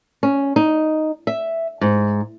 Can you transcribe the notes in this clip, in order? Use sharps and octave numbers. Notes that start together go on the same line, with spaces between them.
C#4
D#4
E5
G#2